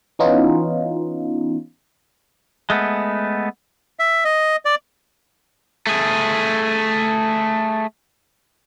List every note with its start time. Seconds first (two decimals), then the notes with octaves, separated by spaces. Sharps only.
0.19 E3 B3 C#4 D#4 F4
2.70 G#3 A3 B3
3.99 E5
4.25 D#5
4.65 D5
5.87 A3 G#4